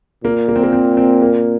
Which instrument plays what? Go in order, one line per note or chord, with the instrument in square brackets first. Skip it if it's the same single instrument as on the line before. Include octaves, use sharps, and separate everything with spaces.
[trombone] A#2 [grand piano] A#3
[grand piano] A#3
C4
A#3
C4
C4
A#3